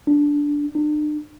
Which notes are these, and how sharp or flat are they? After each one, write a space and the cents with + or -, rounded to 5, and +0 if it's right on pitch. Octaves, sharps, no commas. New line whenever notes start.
D4 -10
D4 +40